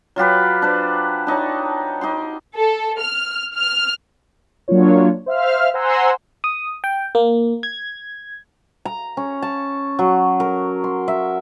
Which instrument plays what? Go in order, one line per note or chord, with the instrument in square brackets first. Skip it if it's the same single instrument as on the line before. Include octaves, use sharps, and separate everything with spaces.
[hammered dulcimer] F#3 F4 G4 B4
D4 B4 C5
D4 D#4 C#5 A5
D#4 G4 C6
[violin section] A4
F6
F6
[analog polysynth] F#3 A#3 D4 F4 C#5
C5 E5 F5 F6
C5 F#5 G#5 A#5 C6 E6
[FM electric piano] D#6
G5
A#3
G#6
[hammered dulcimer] A#5
C#4
A5
F#3
A#4
C6
E5